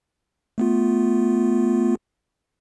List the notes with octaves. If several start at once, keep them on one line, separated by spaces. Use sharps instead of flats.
A3 B3 F4